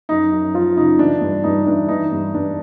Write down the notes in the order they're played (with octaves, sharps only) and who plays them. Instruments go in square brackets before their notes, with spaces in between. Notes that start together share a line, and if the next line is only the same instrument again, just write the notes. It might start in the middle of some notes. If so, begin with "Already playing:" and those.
[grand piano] F#2 D#4
F#2
F3 F4
C#3 D#4
E3 D4
G2
G2 D#4
E3 D4
E3 D#4
G2
G2 D4